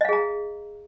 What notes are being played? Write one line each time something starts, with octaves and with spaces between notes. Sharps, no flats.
G#4 D#5 F5 A#5